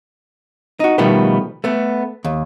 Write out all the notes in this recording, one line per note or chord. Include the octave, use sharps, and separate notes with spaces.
D#4 F#4
B2 D#3 F3 G3 A3 B3
A3 B3
D#2